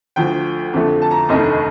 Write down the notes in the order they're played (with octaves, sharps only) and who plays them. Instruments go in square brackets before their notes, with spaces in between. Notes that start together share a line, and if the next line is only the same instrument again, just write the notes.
[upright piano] D2 D3 F3 G5
F2 D3 F3 A3
A5
A#5
F1 D#2 D3 A3 D#5